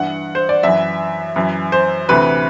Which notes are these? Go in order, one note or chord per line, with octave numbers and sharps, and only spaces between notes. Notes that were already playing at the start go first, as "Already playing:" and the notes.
Already playing: G2 E3 F#5
C5
D5
F#2 E3 E5
F#2 E3
C5
D2 C3 E3 B4